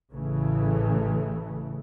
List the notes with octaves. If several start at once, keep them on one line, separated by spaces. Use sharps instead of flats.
A1 C#3 E3 A3